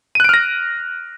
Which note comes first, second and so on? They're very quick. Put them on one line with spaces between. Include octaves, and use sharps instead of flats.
D#7 F#6 D7 F6 A#6